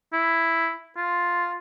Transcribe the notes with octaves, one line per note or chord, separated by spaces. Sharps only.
E4
F4